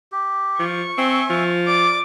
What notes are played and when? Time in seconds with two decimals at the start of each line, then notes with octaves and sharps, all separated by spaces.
0.12 G4
0.59 F3 C#6
0.98 C4 E5 G#5
1.30 F3
1.68 D5 D6